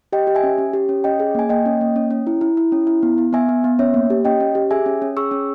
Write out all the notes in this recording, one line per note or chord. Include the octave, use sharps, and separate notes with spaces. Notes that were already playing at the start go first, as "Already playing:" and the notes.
G4 D#5 G5
G4
E5 G#5
C#4
C#4
G4
C#4
C#4 D#5 G5
G#4
A#3 G#5
A#3 D#5 G5
C#4
A#3
C#4
C#4
E4
E4
E4
C#4
E4
B3
B3
B3 E5 G#5
B3
B3
C#4 C#5 E5
A#3
G4
C#4 D#5 G5
C#4
G4
G#4 E5 G#5
C#4
C#4
G#4 C#6 E6
C#4